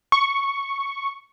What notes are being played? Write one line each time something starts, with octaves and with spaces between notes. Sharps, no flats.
C#6